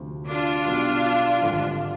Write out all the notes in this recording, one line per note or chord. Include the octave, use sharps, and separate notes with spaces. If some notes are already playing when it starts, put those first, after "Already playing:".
Already playing: D2 C3 F3
D4 F4
B1 B2 G3 B3
G#1 G2 D3 F3